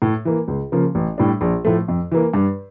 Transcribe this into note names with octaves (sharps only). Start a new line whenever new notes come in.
A2
E3 A#3
C#2
C#3 F3 A#3
A1
A2 G3 D4
A#1
A2 F3 A3
F2
E3 A#3
G2